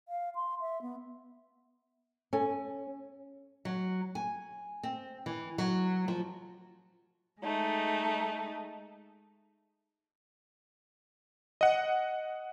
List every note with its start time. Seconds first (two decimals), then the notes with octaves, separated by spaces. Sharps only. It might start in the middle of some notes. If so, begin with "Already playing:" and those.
0.08 F5
0.35 C6
0.60 E5
0.82 B3
2.33 C#4 A4 G#5
3.65 F#3
4.15 G#5
4.83 C4
5.26 E3
5.58 F#3
6.08 F3
7.41 G#3 A3 D#4
11.61 D#5 F#5